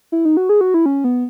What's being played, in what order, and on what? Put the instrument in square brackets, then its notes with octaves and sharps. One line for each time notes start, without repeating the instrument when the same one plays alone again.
[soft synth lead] E4
D#4
F#4
G#4
F#4
E4
C#4
B3